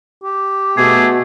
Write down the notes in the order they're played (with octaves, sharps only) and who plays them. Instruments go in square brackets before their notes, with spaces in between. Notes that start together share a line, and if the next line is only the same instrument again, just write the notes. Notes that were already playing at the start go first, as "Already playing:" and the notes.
[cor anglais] G4
[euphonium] B2 [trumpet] A3 [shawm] G#4